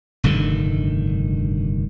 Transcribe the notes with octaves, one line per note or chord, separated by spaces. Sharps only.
F1 G2 D3 D#3